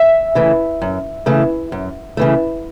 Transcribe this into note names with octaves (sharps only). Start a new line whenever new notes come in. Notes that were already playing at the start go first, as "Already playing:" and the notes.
Already playing: E5
C#3 E3 A3
F#2
C#3 E3 A3
F#2
C#3 E3 A3